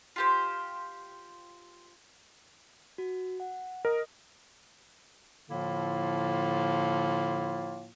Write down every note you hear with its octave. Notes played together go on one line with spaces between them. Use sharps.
F4 G4 C5
F#4
F#5
A#4 D#5 D#6
A2 D3 F3 A#3 E4 F4